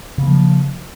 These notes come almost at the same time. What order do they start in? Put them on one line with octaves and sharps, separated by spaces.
C#3 A#3 F3